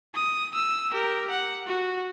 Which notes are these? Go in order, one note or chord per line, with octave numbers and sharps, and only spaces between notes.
D#6
E6
G4 A#4
F#5
F#4